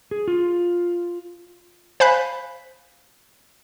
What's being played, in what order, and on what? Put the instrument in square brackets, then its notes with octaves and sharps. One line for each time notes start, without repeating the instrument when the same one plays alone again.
[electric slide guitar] G#4
F4
[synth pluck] C5 F5 G#5 B5 F#6 B6